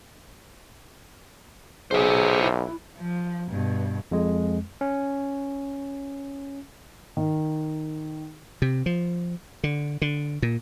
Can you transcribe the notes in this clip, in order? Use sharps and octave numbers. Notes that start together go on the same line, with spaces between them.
B1 G#4 C5 E5
E4
F3
G2 B2
F2 G#3
C#4
D#3
C3
F3
D3
D3
A#2